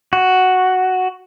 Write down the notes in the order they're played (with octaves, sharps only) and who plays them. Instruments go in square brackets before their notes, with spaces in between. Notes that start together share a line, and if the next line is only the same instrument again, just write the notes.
[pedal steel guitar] F#4